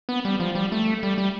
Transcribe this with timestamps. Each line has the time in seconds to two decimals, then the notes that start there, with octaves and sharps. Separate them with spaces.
0.09 B3
0.25 G3
0.40 F3
0.55 G3
0.72 A3
1.03 G3
1.18 G3